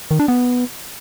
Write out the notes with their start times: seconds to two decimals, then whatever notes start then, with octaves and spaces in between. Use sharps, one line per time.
0.11 D#3
0.20 D4
0.28 B3